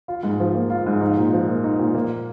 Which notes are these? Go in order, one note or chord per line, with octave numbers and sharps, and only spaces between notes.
F4
G#2
F3
A#3
F4
G#2
D#4
A#2
F3
A#3
D#4
A#2
A#3